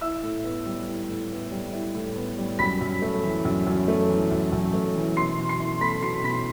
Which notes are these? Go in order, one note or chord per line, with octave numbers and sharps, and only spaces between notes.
E4 E5 E6
A2
B3
G3
E4
A2
B3
G3
E4
A2
B3
G3
F#2 B5 B6
F#2
A3
E3
F#2
F#2
A3
E3
F#2
F#2
A3
E3
B2 C6 C7
B2
C6 C7
E4
A3 B5 B6
B2 C6 C7
B2 B5 B6